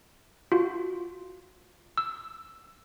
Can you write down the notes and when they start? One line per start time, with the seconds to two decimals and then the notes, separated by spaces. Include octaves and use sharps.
0.52 F4 F#4
1.98 E6